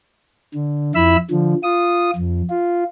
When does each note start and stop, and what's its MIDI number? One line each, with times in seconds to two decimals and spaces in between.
0.55 0.92 50
0.95 1.17 41
0.95 1.17 64
0.95 1.17 76
0.95 1.17 83
0.95 1.17 88
1.31 1.55 50
1.31 1.55 53
1.63 2.11 65
1.63 2.11 87
2.16 2.42 41
2.50 2.84 65